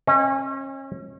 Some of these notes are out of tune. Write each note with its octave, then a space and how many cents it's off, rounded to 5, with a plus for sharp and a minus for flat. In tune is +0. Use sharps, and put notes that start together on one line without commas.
C#4 -35 D#5 +0